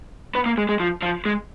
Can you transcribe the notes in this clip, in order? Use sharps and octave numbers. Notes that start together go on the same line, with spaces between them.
B3
A#3
G#3
G#3
F3
F3
G#3